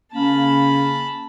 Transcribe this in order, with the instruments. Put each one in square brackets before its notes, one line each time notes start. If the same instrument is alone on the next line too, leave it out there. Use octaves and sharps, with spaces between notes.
[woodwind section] C#3 A#3 C#4 [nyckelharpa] A5 B5